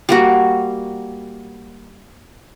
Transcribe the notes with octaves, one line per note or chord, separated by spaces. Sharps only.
G3 A#3 F#4